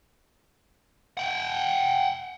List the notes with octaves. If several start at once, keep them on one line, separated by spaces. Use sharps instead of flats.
F#5 G5